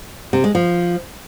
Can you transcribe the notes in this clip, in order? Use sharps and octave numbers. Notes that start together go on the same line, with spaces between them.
C3
G#3
F3